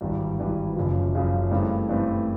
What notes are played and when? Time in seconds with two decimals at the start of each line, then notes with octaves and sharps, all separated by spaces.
0.01 G#1 G2 E3 G3
0.39 G#1 G2 E3 G3
0.76 F#1 F#2 C#3 F3
1.15 F#1 F#2 C#3 F3
1.51 G2 E3 A3 C4
1.89 G2 E3 A3 C4